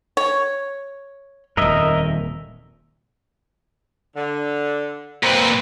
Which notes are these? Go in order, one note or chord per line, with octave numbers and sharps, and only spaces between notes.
C#5
D#1 F2 A#4 D#5 E5
D3
A#2 C4 B4 C5